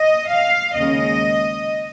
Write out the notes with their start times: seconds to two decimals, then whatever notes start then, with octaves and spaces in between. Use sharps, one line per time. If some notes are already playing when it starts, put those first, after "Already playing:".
Already playing: D#5
0.30 F5
0.75 D#2 C#3 G#3 D#5